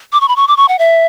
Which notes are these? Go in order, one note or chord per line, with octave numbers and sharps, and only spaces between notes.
D6
C#6
B5
C#6
D6
C#6
F#5
E5